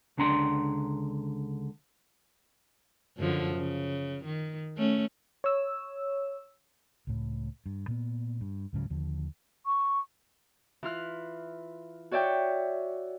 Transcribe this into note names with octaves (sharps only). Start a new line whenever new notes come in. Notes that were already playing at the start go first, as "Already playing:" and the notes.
C#2 D3 D4 A#5 C6
F#2 D3 F3
C#3
D#3
A3 C#4
C#5 E6
C#2 A2
G2
A#2 B3
G2
C#2 G#2 C#3 F#3
D#2 D3 F3
C#6
E3 F4 F6 F#6
F#4 C#5 D5 E5 G5